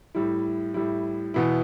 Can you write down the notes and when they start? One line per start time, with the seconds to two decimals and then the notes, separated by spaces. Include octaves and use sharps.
0.15 A2 G3 E4
0.74 A2 G3 E4
1.34 E2 B2 B3 E4